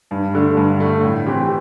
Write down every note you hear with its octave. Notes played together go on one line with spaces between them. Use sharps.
G2
D3 A3
G2
D3 A3
A2
E3 C4 G4